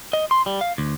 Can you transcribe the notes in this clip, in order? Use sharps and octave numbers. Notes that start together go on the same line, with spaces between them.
D#5
C6
G3
F5
D2